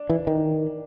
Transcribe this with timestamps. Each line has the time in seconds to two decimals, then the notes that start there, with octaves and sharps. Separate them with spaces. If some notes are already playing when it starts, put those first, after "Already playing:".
Already playing: D4
0.10 E3
0.27 D#3